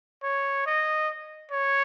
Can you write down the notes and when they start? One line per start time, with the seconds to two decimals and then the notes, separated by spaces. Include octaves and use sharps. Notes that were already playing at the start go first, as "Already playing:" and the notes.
0.23 C#5
0.66 D#5
1.51 C#5